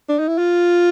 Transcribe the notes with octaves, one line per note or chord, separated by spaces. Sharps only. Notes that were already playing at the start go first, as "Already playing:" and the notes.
D4
D#4
E4
F4